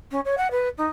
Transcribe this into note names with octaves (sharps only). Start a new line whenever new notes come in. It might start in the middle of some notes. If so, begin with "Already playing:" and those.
C#4
C#5
F#5
B4
D#4